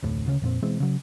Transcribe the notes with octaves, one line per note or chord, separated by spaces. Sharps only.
F1 D2 A2
D2 C#3 C#4
F2 A#2 C4
B2 E3 G#3 C4
C#3 F#3